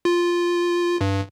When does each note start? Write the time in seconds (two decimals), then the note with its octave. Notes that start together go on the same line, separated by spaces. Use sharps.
0.05 F4
1.01 G2